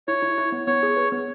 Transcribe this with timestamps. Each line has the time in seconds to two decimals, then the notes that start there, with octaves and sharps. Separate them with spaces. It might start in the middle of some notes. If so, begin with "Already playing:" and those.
0.08 E4 C#5
0.22 E4
0.38 E4
0.52 B3
0.67 B3 C#5
0.83 G#4
0.97 B4
1.12 B3